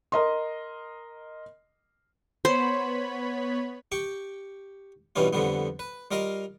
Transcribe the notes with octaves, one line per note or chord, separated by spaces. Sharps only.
A#4 D#5 C6
B3 C5 C#5 B5
G4 G5 C#6
G2 B2 E3 G3 C#4 F4
F2 D3 F3 G3 B3
B4
G3 F4 A#4 D#5 F5